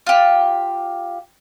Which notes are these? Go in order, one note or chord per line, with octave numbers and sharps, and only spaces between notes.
F4 G4